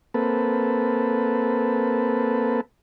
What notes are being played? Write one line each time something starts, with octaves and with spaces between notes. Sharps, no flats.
A#3 C4 A4 B4